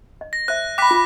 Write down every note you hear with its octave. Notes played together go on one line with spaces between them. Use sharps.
D#5
A#6
C5 E5 F#6
G5 B5 D6 F#6 B6
F4